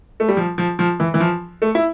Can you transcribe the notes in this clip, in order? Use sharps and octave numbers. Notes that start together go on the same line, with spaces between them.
A3
G3
F3
F3
F3
E3
E3
F3
A3
E4